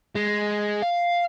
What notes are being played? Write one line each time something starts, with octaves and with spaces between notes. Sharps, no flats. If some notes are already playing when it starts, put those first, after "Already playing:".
G#3
F5